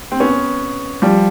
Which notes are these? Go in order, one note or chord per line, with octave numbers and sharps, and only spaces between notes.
C4
B3 C#4
F3 G3